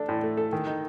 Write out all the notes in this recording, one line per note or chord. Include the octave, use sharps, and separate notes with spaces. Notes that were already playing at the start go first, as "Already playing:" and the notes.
Already playing: A3 D4 A4
A2
A3
A4
D#3
D#4